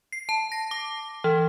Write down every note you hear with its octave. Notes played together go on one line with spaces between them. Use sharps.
C7
A5
A#6
D6
E3